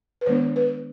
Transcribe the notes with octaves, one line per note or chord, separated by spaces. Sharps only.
B4
D#3 G#3 B3 D4 C5
B4